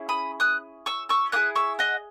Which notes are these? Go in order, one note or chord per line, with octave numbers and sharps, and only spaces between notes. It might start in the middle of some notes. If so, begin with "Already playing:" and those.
Already playing: C#4 E4 G#4
B5 D#6
D#6 F#6
C#6 E6
C#6 E6
A#3 E4 G#4 D#6 F#6
C#6 E6
D#5 F#5